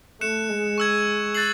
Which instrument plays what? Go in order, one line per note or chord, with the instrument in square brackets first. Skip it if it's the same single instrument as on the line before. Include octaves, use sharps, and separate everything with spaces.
[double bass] A3 [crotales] F#6 C#7 E7
[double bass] G#3
[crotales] C#6 E6 G#6
F#6 A6 C7 F#7